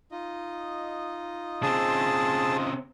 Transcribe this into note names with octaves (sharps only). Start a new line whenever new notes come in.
D#4 F4 D#5
C#3 C4 G#4 A5